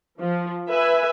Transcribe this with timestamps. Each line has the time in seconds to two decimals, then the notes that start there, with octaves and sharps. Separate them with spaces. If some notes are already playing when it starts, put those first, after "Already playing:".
0.20 F3
0.70 B4 E5 G#5